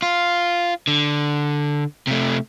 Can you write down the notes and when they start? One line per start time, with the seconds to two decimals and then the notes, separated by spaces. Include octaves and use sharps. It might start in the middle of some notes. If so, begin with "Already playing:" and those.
0.02 F4
0.87 D3
2.07 C3 A3